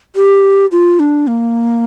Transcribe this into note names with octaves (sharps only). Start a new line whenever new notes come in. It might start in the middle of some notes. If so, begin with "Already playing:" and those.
G4
F4
D4
A#3